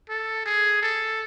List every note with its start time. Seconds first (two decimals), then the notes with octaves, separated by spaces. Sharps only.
0.09 A4
0.46 G#4
0.83 A4